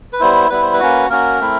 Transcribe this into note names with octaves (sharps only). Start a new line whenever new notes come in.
B4
G3 B3 E4 C5
G3 B3 E4 B4
C5
B4
A#3 C#4 F#4
A#3 C#4 F#4 A#4
A3 C4 E4